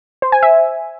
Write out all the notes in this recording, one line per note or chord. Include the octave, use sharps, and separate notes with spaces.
C5
G#5
E5